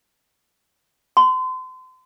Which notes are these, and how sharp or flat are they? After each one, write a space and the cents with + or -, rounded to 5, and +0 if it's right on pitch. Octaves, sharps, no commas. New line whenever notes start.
C6 -35